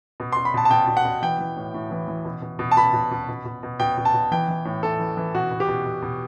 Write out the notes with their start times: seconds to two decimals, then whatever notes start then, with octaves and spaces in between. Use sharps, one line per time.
0.20 B2
0.32 B2 C6
0.45 B5
0.54 B2 A5
0.65 A5
0.71 B2 G5
0.88 B2
0.97 F#5
1.05 B2
1.22 E3 G5
1.39 E3
1.57 A2
1.74 A2
1.91 E3
2.08 E3
2.25 B2
2.42 B2
2.59 B2
2.71 A5
2.77 B2 B5
2.93 B2
3.11 B2
3.29 B2
3.45 B2
3.63 B2
3.80 B2 G5
3.98 B2
4.05 A5
4.14 B2
4.32 E3 G5
4.48 E3
4.65 A2
4.83 A2 A4
5.00 E3
5.17 E3
5.35 B2 F#4
5.51 B2
5.60 G4
5.68 B2
5.86 B2
6.02 B2